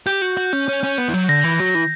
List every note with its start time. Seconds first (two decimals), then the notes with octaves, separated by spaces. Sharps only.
0.07 G4 G6
0.22 F#4
0.37 F#4
0.53 C#4
0.68 C#4
0.83 C#4
0.98 B3
1.09 E3
1.14 F#3
1.29 D3 A#6
1.44 E3
1.60 F#3
1.75 E3